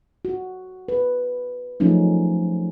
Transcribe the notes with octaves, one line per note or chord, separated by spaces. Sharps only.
F#4
B4
F3 F#3 A3 C#4 D#4